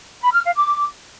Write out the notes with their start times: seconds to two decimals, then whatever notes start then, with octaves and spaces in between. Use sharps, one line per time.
0.21 B5
0.32 F6
0.44 F5
0.56 D6